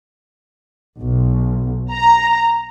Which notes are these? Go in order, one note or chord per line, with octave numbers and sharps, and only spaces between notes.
B1
A#5